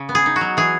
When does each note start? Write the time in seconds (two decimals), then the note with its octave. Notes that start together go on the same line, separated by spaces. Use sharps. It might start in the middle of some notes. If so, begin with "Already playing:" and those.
Already playing: C#3
0.09 B3
0.15 G#4
0.26 D#4
0.36 F#4
0.41 F#3
0.57 E3 G#4